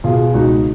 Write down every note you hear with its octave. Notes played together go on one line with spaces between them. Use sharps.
B2 F4 G#4
F4
C#2 D#4 F#4